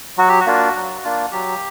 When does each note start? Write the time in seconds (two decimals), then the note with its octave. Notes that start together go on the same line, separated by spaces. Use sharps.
0.18 F#3 F#4
0.29 G4
0.40 F#4
0.46 A#3 D4 F4
0.75 F#3
1.03 A#3 D4 F4
1.32 F#3 G4